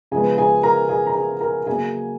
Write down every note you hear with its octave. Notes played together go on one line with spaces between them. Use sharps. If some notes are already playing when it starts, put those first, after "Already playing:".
C#3 F3 G#3 B3 G#4 G#5
G#4 G#5
A#4 A#5
G#4 G#5
A#5
G#4 G#5
A#4 A#5
C#3 F#3 A#3 G#4 G#5